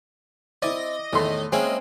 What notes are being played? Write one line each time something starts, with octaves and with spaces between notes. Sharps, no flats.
C4 E4 D5 D#5
E2 A2 D#3 A3 C6
G#3 A#3 C4 C#4 E4 G#5